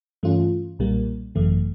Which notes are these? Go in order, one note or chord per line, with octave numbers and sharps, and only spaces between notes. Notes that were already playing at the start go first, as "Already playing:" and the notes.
G2 E3 A3 C#4 F4
B1 A#2 G3 A#3
G#1 F#2 C#3 E3 A3